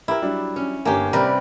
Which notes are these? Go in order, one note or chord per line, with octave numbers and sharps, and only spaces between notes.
E4 G4 A#4
F#3 G3 D4
C#4
G1 A#3 C#4 G4 G#5
C3 G3 C4 A#4 B4 D5